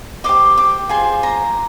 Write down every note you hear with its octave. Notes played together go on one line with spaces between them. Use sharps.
G4 C5 D#5 D6
D6
F4 G#4 C5 C6
A#5